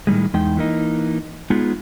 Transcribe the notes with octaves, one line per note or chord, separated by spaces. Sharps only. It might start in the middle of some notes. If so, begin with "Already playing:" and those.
A2 D#3 G3 G#3
E2 G#3 D#4 G5
E3 A#3 D#4
G#3 B3 D#4 F4 G#4